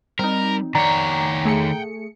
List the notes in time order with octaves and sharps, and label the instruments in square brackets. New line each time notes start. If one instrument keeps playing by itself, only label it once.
[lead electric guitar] G3 [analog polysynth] C4 D#4 [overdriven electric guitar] A#4
[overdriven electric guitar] D#3 C#5 [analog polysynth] D5 [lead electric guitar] F#5 G5 [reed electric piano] A#5
[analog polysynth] A3 G#4 C#7